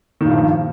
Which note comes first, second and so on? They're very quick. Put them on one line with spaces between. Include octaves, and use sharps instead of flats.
D#3 A#2 G2 F3